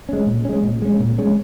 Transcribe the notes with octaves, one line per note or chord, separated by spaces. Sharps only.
G#3 C#4
A#2
G#3 C#4
A#2
G#3 C#4
A#2
G#3 C#4